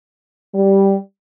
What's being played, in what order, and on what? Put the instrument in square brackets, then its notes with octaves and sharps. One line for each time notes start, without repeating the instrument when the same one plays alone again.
[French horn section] G3